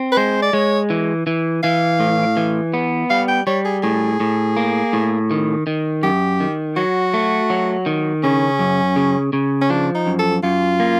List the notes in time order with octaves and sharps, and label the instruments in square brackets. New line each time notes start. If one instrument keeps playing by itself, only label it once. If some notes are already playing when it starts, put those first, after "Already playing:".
Already playing: [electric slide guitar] C4
[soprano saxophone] B4
[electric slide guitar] G#3 [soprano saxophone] C5
[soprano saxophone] D5
[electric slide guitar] G#3 [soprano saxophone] C#5
[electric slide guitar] E3
E3
[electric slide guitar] E3 [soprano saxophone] F5
[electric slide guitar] A2
E3
B3
[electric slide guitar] G3 [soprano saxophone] F5
[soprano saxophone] G5
[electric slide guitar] G3 [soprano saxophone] C#5
[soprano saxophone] G#4
[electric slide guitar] A2 [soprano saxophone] G#4
[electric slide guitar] A2
A#3
A2
D#3
D#3
[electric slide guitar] F#2 [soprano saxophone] G4
[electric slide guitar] D#3
[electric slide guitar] F#3 [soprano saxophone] F#4
[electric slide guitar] A3
F#3
D#3
[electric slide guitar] C#3 [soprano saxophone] C#4
[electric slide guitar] F#2
C#3
C#3
[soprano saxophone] C#4
[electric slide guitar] F3 [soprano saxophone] D4
[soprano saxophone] D#4
[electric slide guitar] F#2
[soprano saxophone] A4
[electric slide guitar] F#2 [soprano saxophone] F4
[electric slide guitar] A#3